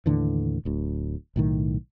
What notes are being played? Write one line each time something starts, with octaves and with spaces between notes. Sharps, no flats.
D#2 A2 D3 E3
D1 D2
B1 A2 D#3